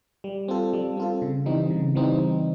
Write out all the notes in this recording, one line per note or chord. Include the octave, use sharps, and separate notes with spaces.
G3
C4 F4 A4
G3
C4 F4 A4
C#3
E3 G3 C4 D#4
C#3
E3 G3 C4 D#4